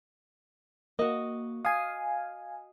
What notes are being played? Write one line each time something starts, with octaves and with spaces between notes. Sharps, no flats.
A#3 F#4 D#5
F5 G#5 D#6 C7